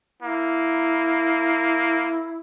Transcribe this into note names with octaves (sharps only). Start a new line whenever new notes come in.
A#3 E4